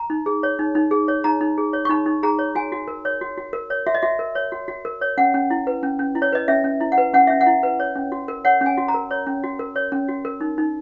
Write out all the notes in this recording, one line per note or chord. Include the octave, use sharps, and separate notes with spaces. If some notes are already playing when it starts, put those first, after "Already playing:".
Already playing: A#5
D#4
G#4
C#5
D#4
D#4
G#4
C#5
D#4 A#5
D#4
G#4
C#5
C#6
D#4 B5
D#4
G#4 A#5
C#5
F#4 G#5
F#4
A#4
C#5
F#4
F#4
A#4
C#5
F#4 E5
D#5
F#4 E5
A#4
C#5
F#4
F#4
A#4
C#5
C#4 F#5
C#4
E4
B4
C#4
C#4
E4
C#5
B4 D#5
C#4 E5
C#4
E4
F#5
B4
C#4 F#5
C#4 E5
F#5
E4
B4
C#5
C#4
F#4
A#4
C#5 F#5
C#4 G#5
F#4
A#5
A#4
C#5
C#4
F#4
A#4
C#5
C#4
F#4
A#4
D#4
D#4